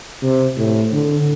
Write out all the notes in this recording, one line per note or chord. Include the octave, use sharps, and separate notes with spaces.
C3
A2
D3